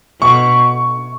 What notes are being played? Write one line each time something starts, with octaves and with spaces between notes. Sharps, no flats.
B2 C#6